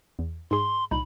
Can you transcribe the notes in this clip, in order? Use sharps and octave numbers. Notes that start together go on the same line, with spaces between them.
E2
G#2 G#4 C6
C2 A#2 D#4 B5